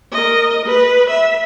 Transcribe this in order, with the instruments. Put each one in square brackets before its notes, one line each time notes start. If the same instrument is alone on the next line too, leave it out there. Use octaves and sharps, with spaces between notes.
[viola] A#4 D#5
B4
E5